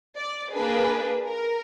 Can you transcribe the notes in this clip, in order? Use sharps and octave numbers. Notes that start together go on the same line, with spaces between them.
D5
A#3 D4 G#4 B4
A#4